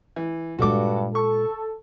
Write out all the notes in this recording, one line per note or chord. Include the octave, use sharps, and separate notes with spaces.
E3
G2 A#2 G#3 F#4 A4 D6
A4 C#6